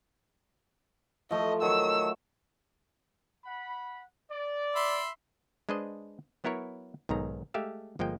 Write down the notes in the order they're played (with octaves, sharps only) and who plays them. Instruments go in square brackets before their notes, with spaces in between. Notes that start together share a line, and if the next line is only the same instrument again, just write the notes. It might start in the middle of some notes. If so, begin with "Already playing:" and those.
[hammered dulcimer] F3 A3 [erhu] D#5
[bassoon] D#3 [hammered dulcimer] F#3 C#5 [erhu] E6
[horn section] F#5 B5
D5
[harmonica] E5 B5 C6
[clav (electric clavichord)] G#3 D4 B4 C5 D#5
F#3 B3 E4 A#4 C#5
B1 G#2 D#3 A#5
G#3 A3 G4 E5 F5
G1 F3 G#3 A#3 G5